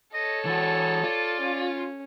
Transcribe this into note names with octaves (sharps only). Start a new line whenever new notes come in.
A4 C#5 D#5
E3 F#4 A5
F4 D5
C#4